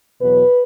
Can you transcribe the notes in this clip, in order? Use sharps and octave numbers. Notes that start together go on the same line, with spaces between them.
E2 B2 F#3 B4